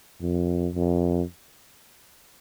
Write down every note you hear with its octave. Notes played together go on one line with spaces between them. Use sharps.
F2
F2